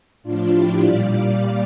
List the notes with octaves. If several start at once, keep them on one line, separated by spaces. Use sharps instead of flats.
A2 F3 D4 F4
E4 G4
A#2 G3 D5 F5